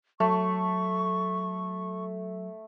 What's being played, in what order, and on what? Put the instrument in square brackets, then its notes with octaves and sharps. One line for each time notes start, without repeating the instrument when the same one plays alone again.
[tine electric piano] F#3 [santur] A3 [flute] C#6